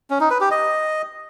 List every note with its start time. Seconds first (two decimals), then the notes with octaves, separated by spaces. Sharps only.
0.10 C#4
0.20 D#4
0.31 B4
0.41 G4
0.51 D#5